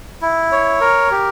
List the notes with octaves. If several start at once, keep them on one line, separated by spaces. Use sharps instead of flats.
E4
C#5
A#4
G4